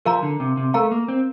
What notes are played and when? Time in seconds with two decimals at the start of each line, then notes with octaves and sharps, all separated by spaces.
0.06 F3 A#4 F5 A#5
0.23 D3
0.40 C3
0.57 C3
0.74 A3 A#4 F5 A#5
0.91 A#3
1.08 C4